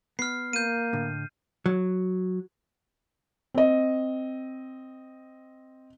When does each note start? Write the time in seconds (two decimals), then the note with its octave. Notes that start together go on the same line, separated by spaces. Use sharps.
0.19 B3 F6 C7
0.53 A#3 G6 D#7
0.93 A2 D3
1.66 F#3
3.54 C4 D#5